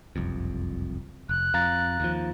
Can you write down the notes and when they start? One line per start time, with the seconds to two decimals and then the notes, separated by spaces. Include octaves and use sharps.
0.16 F#1 C2 F2
1.29 F1 F#6
1.54 F2 F5 A#5 A6
2.00 D#2 F3